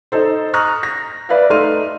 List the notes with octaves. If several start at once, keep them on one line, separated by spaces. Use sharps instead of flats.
D#4 A4 C5
A#5 C#6 D#6 F6 F#6 A#6
A#6
B4 D5 E5 F5
A3 D#4 C6 F6 D#7